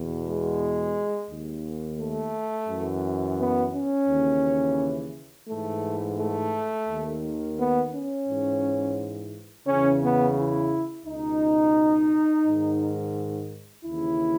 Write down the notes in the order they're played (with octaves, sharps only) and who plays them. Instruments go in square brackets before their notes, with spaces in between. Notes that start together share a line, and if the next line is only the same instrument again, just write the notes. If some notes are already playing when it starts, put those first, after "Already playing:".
Already playing: [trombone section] E2 B2
G#3
D#2 D#3
A3
F#2 E3
B3
C#4
D#2 C#3 E3
G#2 E3 A3
A3
D#2 D#3
B3
C#4
G#2 E3
E2 C#3 E3 C#4
B3
E4
C#2 B2 D#4
G#2 D#3
D#2 C#3 E3 E4